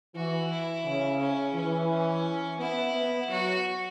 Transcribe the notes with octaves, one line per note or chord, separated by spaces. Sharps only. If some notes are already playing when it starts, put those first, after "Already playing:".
E3 F#4
E4
C#3
C#4
E3 C#4
C#4
B3 E4
B3
F#3 F#4